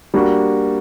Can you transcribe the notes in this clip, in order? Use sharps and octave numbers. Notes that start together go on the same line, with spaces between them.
G3 A#3 D4 F#4